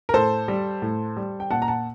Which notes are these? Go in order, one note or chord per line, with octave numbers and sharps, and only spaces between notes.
A#4
A2 A4 C5
G3
A2
G3
G5
A#2 F#5 A5
A#5
F#5 A5